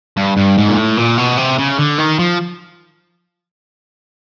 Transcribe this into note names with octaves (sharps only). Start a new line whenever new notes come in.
G2
G2
G#2
A#2
A2
A#2
B2
C3
C#3
D3
D#3
F3